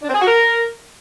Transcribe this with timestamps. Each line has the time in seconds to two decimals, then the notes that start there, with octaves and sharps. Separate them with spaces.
0.02 D4
0.08 C4
0.14 G#4
0.20 F#4
0.27 A#4